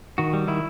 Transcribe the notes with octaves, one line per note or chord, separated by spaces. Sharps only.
D#3 F#4
G3
D#3 E4